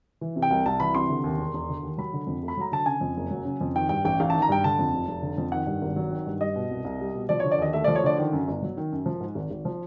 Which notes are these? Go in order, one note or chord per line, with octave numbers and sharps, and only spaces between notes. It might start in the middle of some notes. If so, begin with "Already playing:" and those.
E3
C3
G5
C2
C2 A5
E3 B5
C3 C6
D3
D#2
E1
E1
D3
D#2
F#3 B5
D3
F2
A3
B5
F#3 A#5
D3 A5
C#3 G#5
F2
F#1
F#3
C#3
F2
D#3 G5
G2 G5
A1 G5
A1 F5
D#3 A5
A#5
G2 G5
D3 A5
F2
F1
F1
D3
F2
D#3 F#5
G2
G#1
F#3
D#3
G2
G3 D#5
B2
C2
C2
G3
B2
F3 D5
D3 C#5
D5
D#2 D#5
A3 E5
F3 D5
C#5
D3 D5
D#3
F#2
G1
F#3
D#3
F#2
F3
G#2
G#1
G#1
F3